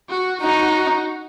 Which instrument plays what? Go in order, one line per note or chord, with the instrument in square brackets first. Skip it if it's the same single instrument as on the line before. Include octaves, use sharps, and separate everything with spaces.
[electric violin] F#4
[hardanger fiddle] D#4 [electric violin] F#4